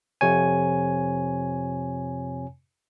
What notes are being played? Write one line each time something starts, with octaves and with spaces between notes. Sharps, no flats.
F2 C3 C#5 G#5